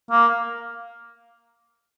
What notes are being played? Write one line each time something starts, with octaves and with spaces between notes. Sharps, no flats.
A#3